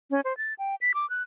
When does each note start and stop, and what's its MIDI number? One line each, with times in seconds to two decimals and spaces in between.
0.11 0.21 61
0.25 0.36 72
0.37 0.54 93
0.59 0.75 79
0.81 0.92 95
0.95 1.08 86
1.10 1.22 90